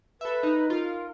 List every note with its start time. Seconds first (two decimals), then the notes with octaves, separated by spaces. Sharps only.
0.21 A4 B4 E5
0.43 D#4
0.70 F4 A#4